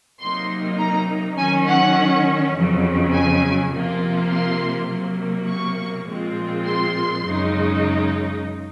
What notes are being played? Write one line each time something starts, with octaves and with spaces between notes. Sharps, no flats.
C3 F#3 A#3 D#4 C6
A#5
D#3 F#3 C#4 G#5
F#5
F2 C#3 F#3
G#5
C3 F3 A#3 F4
C6
C3 F#3 A#3
C#6
A#2 F3 G#3 C4 F4
C6
F#2 C#3 G#3 D#4